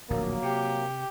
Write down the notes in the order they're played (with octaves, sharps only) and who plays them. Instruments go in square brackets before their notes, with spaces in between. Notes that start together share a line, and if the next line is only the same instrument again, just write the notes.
[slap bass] D1 A#1 [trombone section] F#3 A#3
[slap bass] C3 [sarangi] G4